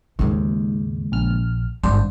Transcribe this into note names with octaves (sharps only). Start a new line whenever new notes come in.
D#2 G#2 C#3 G#3
A#1 F6
G#1 G2 D4 C5